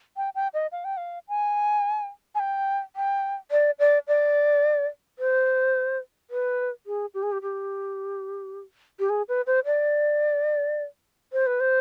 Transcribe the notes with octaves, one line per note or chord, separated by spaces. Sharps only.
G5
G5
D#5
F5
G5
F5
G#5
G#5
G5
G5
D5
D5
D5
C5
B4
G#4
G4
G#4
G4
G4
G4
G#4
B4
C5
D5
C5
B4
C5